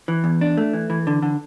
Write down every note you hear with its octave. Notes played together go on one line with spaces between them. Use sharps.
E3
E2
D4
A3
E3
E3
D3
D3